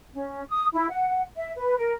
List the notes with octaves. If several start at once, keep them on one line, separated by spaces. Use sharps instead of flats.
C#4
D#6
E4
F#5
E5
B4
A#4